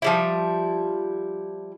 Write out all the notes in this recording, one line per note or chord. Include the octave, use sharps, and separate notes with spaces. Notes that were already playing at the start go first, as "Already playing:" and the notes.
F3 G3 E4